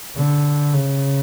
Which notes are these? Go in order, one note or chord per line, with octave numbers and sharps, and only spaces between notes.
D3
C#3